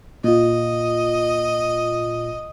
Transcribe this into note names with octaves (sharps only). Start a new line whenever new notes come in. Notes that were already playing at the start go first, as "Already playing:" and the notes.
A#2 F4 D#5